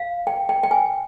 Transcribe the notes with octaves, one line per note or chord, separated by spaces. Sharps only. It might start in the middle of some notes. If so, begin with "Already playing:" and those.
Already playing: F5
G5
G5
G5
G#5